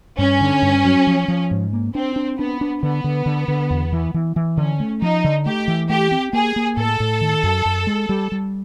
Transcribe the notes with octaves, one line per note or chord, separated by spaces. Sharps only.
G2 C#4
D3
G2
F#3
F3
F3
G#2
A#3
C4 D4
D4
B3 D4
D4
D3 B3
D3
D3
D3
E2
E3
E3
E3
D3 C#4
A3
F3 D#4
D3
A3 G4
E3
A3 G4
C4
A#3 G#4
A#3
A2 A4
A2
D#3
F#2
F#2
G#3
G3
G3